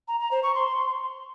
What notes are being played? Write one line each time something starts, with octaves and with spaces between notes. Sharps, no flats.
A#5
A#5
C5
C#6
C6